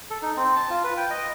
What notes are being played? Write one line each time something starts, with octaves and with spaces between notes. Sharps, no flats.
A4
D#4
C4
A5
F4
B4
G5
D#5